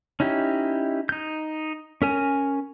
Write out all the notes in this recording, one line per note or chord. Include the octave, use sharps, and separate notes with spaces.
C#4 D#4 E4 G4
D#4 G6
C#4 A#4 G#5